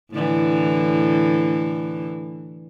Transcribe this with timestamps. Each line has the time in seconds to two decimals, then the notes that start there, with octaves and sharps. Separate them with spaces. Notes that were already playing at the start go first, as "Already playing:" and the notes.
0.11 A2 D3 E3